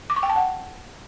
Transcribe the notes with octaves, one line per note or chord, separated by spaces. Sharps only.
D6
C#6
G5
A5
F#5